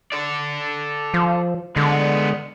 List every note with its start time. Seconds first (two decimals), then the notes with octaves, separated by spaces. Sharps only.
0.12 A4 D5
1.14 F3
1.76 D3 G#3 B3